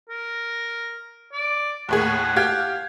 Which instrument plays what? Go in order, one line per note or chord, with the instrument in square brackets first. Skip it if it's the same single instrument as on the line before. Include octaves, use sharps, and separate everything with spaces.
[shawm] A#4
D5
[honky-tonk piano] D#2 A2 G#4 [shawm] F#5
[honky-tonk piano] G4 F5 G#6